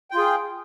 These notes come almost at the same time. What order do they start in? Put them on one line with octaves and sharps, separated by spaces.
G5 F4 G#4